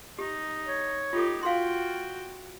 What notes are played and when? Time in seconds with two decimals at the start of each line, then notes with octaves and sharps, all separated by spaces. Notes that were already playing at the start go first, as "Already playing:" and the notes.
0.19 D#4 G4
0.67 C#5
1.13 D#4 F4 G4 A4
1.43 F4 F#4 F5 G5 C6